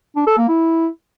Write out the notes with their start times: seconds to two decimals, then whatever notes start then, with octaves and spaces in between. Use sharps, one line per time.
0.16 D4
0.27 A4
0.38 A#3
0.48 E4